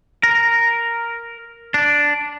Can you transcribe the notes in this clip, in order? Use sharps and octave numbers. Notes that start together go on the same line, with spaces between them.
A#4
D4